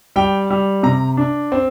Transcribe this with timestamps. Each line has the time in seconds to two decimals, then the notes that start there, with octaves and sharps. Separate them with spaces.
0.16 G3 G5
0.50 G3
0.83 C3 A#5
1.17 D4
1.52 C4